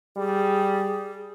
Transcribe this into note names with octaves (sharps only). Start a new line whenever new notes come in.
G3 G#4